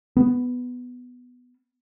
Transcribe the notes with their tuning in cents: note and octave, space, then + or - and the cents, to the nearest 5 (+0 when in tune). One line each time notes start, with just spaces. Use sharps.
B3 +5